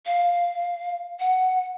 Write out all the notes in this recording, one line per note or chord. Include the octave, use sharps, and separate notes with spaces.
F5
F#5